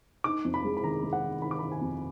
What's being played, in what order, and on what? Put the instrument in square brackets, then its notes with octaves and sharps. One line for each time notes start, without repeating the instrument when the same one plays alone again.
[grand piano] D#4 D6
F2
B5
G#3
B5
D#3 A#5
G#3
F#5
D#3
D#3 B5
D6
D#3 B5
G#5
F2